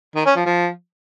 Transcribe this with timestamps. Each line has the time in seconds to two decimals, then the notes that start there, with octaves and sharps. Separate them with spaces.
0.15 D#3
0.25 C#4
0.36 F3
0.46 F3